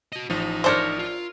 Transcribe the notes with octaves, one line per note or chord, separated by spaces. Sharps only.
F#4 D#5
A1 F3 D#4
D4 A#4 C5 C#5 E5
F4